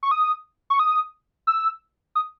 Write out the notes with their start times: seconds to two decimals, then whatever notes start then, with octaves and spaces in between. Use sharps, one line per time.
0.03 C#6
0.11 D#6
0.70 C#6
0.79 D#6
1.47 E6
2.15 D#6